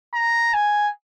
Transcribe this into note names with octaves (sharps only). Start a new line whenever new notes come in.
A#5
G#5